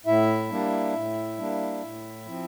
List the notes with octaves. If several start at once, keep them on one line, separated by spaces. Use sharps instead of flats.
A2 E4 E5
G3 A#3 D4
A2
G3 A#3 D4
A2
F3 C4